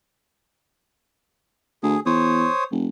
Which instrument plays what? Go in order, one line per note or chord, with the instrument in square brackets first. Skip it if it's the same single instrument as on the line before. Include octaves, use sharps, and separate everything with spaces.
[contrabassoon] D2 [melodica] G#4
[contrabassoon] E2 [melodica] C5 C#5 D#6
[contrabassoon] F1